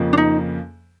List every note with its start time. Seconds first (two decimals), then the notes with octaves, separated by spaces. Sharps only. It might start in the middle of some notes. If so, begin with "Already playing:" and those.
Already playing: F2 C#3 F3 A#3
0.13 D4
0.18 D#4